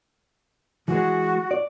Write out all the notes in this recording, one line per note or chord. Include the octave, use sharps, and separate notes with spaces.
E3 G#3 F#4
D5